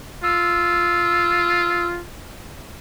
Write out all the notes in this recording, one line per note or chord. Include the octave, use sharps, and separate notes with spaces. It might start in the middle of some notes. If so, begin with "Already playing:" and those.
F4 E6